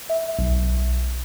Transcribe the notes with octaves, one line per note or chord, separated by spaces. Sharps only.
E5
B1